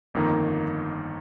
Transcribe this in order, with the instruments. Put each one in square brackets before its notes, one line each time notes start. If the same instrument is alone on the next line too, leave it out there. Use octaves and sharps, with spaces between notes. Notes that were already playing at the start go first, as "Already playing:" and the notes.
[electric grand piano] G1 F2 D#3 A#3 D#4